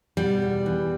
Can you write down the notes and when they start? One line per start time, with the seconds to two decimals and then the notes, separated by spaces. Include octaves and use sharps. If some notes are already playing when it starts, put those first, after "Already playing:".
0.17 B2 G3
0.42 E2
0.66 E3